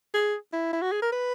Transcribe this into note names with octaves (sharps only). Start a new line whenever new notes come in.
G#4
E4
E4
F#4
G#4
A#4
B4